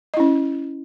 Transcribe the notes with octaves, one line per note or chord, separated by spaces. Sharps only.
C#4 E4 D#5